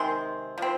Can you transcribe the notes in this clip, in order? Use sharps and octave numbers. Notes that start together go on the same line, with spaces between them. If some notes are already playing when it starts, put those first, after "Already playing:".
Already playing: C3 D#3 G#3 C4 C6
F3 C4